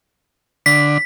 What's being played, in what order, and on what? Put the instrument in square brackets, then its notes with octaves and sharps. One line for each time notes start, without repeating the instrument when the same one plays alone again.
[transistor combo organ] D3 [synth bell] B6